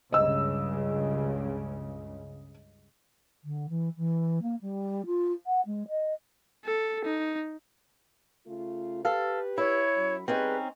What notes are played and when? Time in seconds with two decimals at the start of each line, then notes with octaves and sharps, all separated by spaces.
0.12 C#2 G2 C#3 D#5 E6
3.44 D3
3.69 E3
3.97 E3
4.42 A#3
4.61 G3
5.06 F4
5.46 F#5
5.66 G#3
5.88 D#5
6.65 A4
7.05 D#4
8.47 C#3 A3 F4
9.05 G4 A4 B4 F5
9.58 E4 C#5
9.96 F#2
10.28 G3 C4 C#4 D#4 G#4 B4